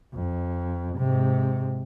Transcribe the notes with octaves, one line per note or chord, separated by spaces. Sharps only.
F2
G#2 C3